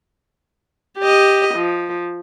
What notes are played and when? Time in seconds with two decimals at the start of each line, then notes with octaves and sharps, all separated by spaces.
0.99 G4 D#5
1.56 F3